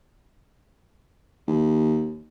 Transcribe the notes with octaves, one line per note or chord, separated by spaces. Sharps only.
D#2